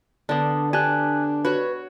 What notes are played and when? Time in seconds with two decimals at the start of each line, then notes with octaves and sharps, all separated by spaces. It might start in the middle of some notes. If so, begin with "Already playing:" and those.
0.29 D3 B3 D4 A5
0.73 D4 G4 G#5 A5 F#6
1.45 F#4 B4 C#5